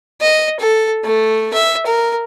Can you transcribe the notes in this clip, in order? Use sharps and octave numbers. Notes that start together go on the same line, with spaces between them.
D#5
A4
A3
E5
A#4